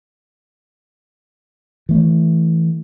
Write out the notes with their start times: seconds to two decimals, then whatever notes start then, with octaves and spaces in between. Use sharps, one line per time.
1.89 E3 A3